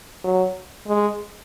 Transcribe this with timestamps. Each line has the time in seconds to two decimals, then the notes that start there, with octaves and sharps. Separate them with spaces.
0.24 F#3
0.88 G#3